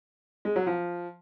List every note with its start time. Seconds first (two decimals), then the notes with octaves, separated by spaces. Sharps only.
0.45 G#3
0.56 F#3
0.67 F3